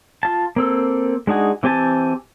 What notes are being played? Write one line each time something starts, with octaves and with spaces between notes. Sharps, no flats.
F4 A5
A#3 C4 A4
G#3 D4 D#4 F#4 G#4
E3 C4 G4 G#5 A5